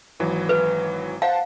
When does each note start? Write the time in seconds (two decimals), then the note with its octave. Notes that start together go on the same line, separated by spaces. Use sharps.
0.20 G#1 E3 F#3
0.49 B4
1.22 C5 F5 F#5 A5